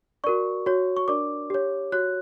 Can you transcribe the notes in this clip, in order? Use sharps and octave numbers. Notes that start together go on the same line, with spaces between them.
F#4 A#4 D5 C#6
F#4 C#5
C#6
D4 A#4 D5 D6
G4 C#5
F#4 C#5 F#6